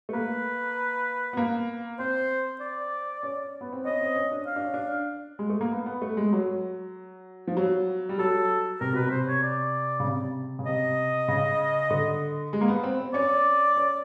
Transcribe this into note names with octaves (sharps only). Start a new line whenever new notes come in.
A3
A#3 B4
B3
A#3
C4 C5
D5
C#4
B3
C4
C#4 D#5
C4
C#4
D4
F5
D4
C#4
D4
G#3
A3
A#3
B3
B3
A3
G#3
F#3
F3
F#3
G3
F#3 A4
C3 A#4
B2 B4
C3 C5
C#5
D5
C#3
C3
C#3
C3 D#5
C#3
D3
G#3
A#3
B3
C4
C4
C#4 D5
C#4